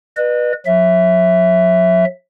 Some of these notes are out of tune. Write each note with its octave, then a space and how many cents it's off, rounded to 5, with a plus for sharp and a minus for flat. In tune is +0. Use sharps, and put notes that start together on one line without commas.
B4 -20 D#5 -45
F#3 -40 E5 +0